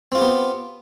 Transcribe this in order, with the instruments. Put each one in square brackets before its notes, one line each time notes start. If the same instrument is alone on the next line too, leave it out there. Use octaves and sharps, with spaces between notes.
[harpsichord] C4
F4
G4
B3